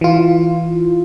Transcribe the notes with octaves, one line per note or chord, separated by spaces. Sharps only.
E3 F4